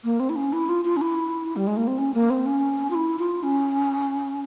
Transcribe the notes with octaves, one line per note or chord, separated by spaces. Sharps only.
A#3
C4
E4
C#4
E4
F4
F4
C#4
E4
G3
G#3
A#3
C4
C#4
A#3
C4
C#4
F4
E4
F4
C#4